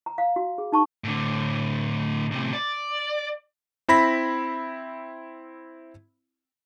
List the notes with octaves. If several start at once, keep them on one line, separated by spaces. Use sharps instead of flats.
A#5
F5
F#4
G#4
D#4 A5 C#6
A2 D3
A2 C3
D5
C4 E4 B5 A#6 B6